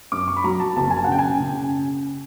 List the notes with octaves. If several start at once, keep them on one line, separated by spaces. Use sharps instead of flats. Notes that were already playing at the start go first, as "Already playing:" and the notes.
F#2 D6
C#6
B5
F#3 A#5
A5
F#1 A5
G#5
A5
F#5
C#3 G5
G#5
C#3